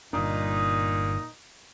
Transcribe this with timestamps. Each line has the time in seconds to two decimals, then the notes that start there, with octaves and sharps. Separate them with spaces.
0.13 G1 G2 A#2 D4 D#4